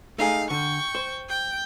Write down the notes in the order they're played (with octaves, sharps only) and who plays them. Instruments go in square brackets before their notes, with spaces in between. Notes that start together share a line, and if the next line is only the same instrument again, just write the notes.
[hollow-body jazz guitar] A3 D#4 G#4 [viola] F5
[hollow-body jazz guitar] D3 [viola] G5 C#6
[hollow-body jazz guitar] C5
[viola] G5